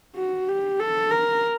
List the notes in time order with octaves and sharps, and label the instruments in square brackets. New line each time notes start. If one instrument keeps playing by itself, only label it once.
[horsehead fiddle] F#4
G4
A4
A#4